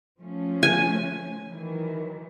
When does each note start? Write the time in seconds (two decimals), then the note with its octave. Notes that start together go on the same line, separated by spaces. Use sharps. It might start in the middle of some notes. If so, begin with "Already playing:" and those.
0.20 F3 A3 C#4
0.63 G#5
1.48 D#3 E3 F#3